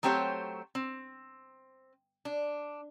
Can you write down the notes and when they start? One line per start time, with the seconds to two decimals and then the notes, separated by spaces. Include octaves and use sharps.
0.03 F#3 A3 C4 G4 C5 C#5
0.75 C4
2.25 D4